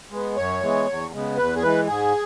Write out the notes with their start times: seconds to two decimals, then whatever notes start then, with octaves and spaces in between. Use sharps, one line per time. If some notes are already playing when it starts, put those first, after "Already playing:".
0.11 G#3 B3
0.36 F#2 C#5
0.61 E3 G#3 B3
0.87 E2
1.13 C#3 G#3 B3
1.37 E2 B4
1.56 G#4
1.62 E3 G#3 B4
1.88 G#2 G#4